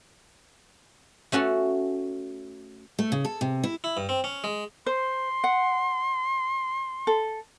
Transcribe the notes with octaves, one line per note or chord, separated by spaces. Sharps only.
A3 C#4 F#4 A5
A3
C#3
A4
C3
E4
E4
G2
C4
C#4
G#3
C5 C6
F#5
A4